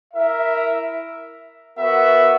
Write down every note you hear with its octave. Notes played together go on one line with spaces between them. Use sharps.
E4 A#4 E5
B3 F#4 A#4 E5